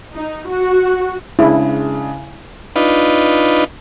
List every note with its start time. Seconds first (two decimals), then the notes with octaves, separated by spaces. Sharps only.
0.14 D#4
0.48 F#4
1.39 C#3 G#3 D4 E4
2.76 D4 D#4 F4 B4